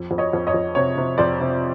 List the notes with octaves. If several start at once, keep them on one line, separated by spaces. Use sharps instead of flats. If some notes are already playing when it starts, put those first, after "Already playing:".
Already playing: F2
F2
C#5 D#5
F2
C#5 D#5
F2
C3 C#5
C3
F2 C5 D5
C3